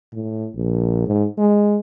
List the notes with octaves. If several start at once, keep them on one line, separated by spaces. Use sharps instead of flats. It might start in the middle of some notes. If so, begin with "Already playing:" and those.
A2
A#1
G#2
G#3